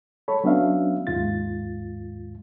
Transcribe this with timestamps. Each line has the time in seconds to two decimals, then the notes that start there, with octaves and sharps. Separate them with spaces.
0.28 A4 C#5 B5
0.44 F#3 B3 C#4 D4 E5 F5
1.07 D#2 G#2 F4 A6